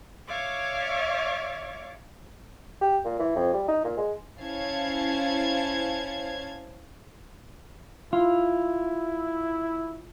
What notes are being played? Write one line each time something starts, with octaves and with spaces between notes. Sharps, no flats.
C#5 D5 E5 F5 C#6 D6
G4
A#2
E3
F2
G3
D#4
A#2
G#3
C#4 E4 C5 F5 A5 G#6
E4 F4